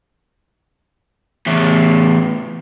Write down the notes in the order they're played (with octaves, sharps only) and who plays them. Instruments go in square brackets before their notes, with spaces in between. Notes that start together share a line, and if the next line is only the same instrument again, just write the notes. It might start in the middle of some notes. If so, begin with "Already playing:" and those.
[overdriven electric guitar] E2 A2